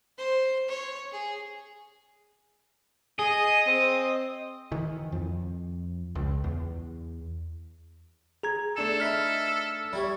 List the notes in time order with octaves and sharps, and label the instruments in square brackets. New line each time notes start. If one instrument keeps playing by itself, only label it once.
[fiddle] C5
C#5
G#4
[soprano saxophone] G#4 [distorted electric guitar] D#5
[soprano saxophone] C4
[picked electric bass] D#3 E3
F2
C#2
E2
[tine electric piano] G#4 A#5 G#6
[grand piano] A3 D4 E7 [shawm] A4
[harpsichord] D#4 E4 B4 [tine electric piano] F6 B6
[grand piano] G3 [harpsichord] E4 G4 C#5